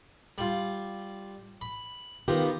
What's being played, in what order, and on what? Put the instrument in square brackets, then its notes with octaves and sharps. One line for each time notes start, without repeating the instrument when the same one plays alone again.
[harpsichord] G3 F4
B5
[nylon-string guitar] D#3 F4 G4 [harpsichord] B3 A#4